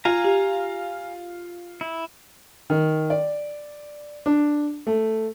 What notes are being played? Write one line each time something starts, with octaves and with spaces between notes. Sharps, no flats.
F4 F5 G#5 A#5
G4
E4
D#3
D5
D4
A3